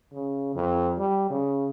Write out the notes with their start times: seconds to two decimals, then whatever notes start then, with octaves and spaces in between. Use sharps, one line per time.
0.12 C#3
0.55 F2
0.98 G3
1.30 C#3